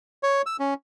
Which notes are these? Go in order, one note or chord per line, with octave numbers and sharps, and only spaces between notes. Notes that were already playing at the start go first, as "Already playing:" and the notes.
C#5
E6
C#4